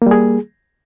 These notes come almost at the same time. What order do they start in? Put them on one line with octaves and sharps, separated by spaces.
A#3 G3 G#4